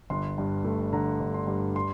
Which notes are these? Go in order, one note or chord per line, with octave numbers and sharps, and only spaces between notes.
G1 C6
G2
A3
D3 A#5
G1
C6
G2
C6